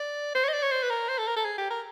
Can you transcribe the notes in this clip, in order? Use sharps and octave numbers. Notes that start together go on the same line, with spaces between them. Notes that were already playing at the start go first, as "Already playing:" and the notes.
Already playing: D5
C5
C#5
D#5
D5
C#5
C5
B4
A#4
C5
A4
A#4
A4
G#4
G4
A#4